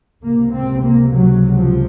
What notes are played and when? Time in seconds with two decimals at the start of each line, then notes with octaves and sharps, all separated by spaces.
0.22 C#2 C3 A#3
0.51 C4
0.80 A#3
1.10 F#3
1.54 F3